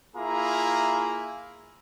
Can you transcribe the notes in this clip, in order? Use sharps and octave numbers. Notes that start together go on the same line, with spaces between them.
A#3 E4 F4 G#4 A#5